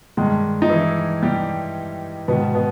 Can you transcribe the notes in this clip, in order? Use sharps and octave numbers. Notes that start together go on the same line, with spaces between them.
G2 D#3 G#3
D#4
E3 E4
G3 G4
G#2 B2 D#3 B3
B2 B3